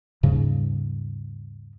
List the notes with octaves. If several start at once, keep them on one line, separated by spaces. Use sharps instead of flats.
D#2 G#2 C#3 G3